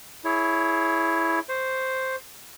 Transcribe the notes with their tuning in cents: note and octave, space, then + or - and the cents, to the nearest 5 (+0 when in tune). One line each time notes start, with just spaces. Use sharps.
E4 +0 G#4 +25 C#5 +10
C5 +0 C#6 +0